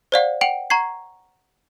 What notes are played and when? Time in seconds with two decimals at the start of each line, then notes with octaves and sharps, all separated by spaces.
0.12 C5 D5 F5 F#5
0.41 F#5 G5 D7 F7 F#7
0.70 F#5 A#5 C#6 G#6 C7